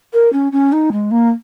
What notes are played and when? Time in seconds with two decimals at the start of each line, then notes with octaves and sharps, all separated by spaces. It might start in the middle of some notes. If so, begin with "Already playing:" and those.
0.13 A#4
0.32 C#4
0.52 C#4
0.72 D#4
0.92 G#3
1.11 A#3